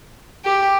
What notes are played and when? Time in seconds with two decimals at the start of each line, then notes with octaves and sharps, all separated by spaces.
0.45 G4